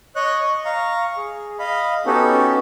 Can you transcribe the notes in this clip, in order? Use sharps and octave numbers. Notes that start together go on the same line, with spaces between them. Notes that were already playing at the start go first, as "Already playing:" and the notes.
C#5 D#5 C#6 F#6
D#5
F5 A#5 C#6
G#4
D#5 F5 B5
B3 C#4 D#4 F#4 G4 A4